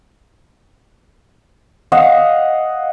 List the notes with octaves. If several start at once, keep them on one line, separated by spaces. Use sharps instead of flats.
D#5 F5 F#5